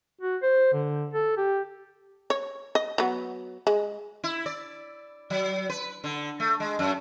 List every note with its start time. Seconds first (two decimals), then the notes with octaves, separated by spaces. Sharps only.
0.21 F#4
0.42 C5
0.73 D3
1.14 A4
1.37 G4
2.30 C#5
2.75 D#5
2.98 F#3 B3
3.67 G#3
4.24 E4
4.46 D5
5.30 F#3
5.69 B4
6.04 D3
6.40 A3
6.60 G#3
6.79 F#2